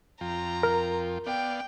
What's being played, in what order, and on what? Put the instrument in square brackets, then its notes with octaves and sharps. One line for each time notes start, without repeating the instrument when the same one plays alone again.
[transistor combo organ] F2 F4 G5 [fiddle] A#5
[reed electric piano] A#4
[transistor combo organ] B3 D5 F5 [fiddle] G5